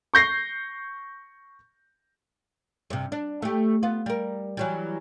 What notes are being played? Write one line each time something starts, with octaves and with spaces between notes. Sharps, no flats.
C#6 G6 A#6 C7
G2 C3
D4
A3 G4
B3 F4
G3 A#4
E3 F#3 G3